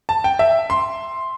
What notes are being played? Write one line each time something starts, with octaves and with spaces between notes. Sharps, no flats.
A5
G5
E5
C6